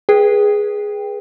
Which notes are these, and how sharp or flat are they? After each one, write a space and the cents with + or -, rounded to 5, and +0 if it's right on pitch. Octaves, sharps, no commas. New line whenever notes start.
G#4 +0 B4 -20 G5 +10